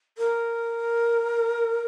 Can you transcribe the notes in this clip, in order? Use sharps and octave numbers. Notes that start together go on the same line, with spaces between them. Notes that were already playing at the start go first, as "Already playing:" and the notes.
A#4